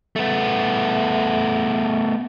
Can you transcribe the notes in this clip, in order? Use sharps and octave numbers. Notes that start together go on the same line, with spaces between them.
A3 B3